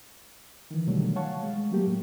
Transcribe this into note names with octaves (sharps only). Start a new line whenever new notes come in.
D#3 E3
B2 D3 D#3 F#3 G3 A3
C#5 F5 F#5 A5 C#6
G#3
F#3 A3 A#3 G4
A2